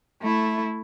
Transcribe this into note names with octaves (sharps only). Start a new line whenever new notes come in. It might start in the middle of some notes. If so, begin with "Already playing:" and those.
A3 E4